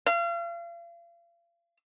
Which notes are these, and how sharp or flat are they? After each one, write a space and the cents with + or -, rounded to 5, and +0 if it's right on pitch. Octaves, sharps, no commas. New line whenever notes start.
F5 -40